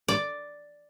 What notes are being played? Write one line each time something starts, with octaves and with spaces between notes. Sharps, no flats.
D5